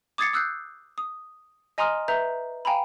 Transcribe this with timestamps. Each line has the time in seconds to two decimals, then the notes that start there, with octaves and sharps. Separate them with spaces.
0.18 D6 D#6 G#6 A6 C7 C#7
0.33 D#6 E6 F#6 G6 C7
0.98 D#6
1.78 D#5 G#5 A#5 C6 D#6 F6
2.08 B4 E5 A#5 G6
2.65 F5 G5 G#5 A#5 B5